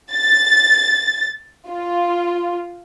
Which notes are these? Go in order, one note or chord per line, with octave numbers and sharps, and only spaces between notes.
A6
F4